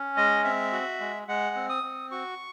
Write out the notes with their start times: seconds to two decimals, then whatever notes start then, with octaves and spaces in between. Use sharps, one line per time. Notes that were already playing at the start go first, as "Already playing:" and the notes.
Already playing: C#4
0.17 G#3 D#5
0.44 C4 E5
0.72 F#4
1.00 G#3
1.28 G#3 F#5
1.56 C4
1.69 D#6
1.83 C4
2.11 F#4 C#6